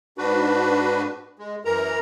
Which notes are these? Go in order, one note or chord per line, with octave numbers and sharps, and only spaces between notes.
G#2 D4 F#4 B4
G#3
F#2 E3 A#4 A#5